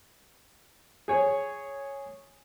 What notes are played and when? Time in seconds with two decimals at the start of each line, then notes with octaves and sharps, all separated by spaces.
1.08 G#4 C#5